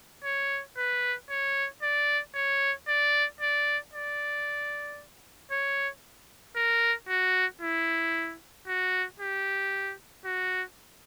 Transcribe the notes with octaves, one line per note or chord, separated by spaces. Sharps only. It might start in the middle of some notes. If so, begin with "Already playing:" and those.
C#5
B4
C#5
D5
C#5
D5
D5
D5
C#5
A#4
F#4
E4
F#4
G4
F#4